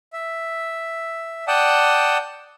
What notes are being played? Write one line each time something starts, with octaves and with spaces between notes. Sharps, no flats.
E5
D5 F#5 G5 A5 D#6